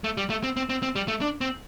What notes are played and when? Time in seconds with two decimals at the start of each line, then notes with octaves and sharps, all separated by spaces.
0.04 A3
0.17 G3
0.30 A3
0.44 C4
0.57 C4
0.70 C4
0.83 C4
0.96 G3
1.08 A3
1.21 D4
1.41 C4